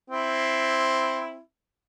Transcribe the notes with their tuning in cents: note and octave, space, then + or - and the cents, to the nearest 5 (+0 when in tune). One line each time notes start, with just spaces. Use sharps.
C4 +5 E4 +0